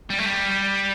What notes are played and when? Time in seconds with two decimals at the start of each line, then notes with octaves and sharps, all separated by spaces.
0.10 G3
0.19 A3
0.26 G3